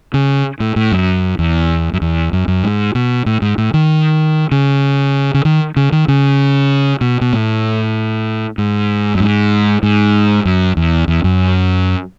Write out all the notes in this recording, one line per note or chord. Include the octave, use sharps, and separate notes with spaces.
C#3
A2
A2
F#2
E2
F#2
E2
F#2
F#2
G#2
B2
A2
G#2
A2
D#3
C#3
C#3
D#3
C#3
D#3
C#3
B2
B2
A2
G#2
F#2
G#2
G#2
F#2
E2
E2
F#2